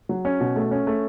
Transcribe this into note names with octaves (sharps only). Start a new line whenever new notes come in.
F#3
C#4
B2
A3
C#4
A3